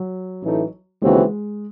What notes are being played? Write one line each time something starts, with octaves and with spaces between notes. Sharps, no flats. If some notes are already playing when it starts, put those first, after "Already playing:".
Already playing: F#3
A1 A2 E3 A3 D#4
D#2 C#3 E3 G#3 C4 F#4